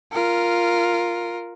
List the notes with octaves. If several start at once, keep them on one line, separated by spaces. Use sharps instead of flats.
F4 A#4